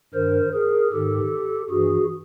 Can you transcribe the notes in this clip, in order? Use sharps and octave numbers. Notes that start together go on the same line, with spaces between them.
G2 D#3 A#4 C5
G#4 A#4
G#2 D#3 G4 A4
G2 E3 F#4 G#4